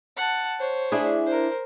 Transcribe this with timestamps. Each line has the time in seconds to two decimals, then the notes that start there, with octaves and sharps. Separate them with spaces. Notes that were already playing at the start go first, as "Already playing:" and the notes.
0.17 F#5 A5
0.60 C5 C#5
0.92 D4 E4 G#4
1.26 A#4 C5